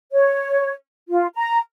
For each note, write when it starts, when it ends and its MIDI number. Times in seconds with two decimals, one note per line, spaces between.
0.13 0.72 73
1.09 1.26 65
1.35 1.58 82